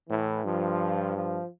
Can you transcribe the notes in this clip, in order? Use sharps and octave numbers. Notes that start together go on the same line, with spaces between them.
A2 E3
G2 F3
F3